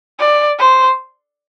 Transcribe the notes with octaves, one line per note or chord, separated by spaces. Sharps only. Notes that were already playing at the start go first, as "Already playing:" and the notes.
D5
C5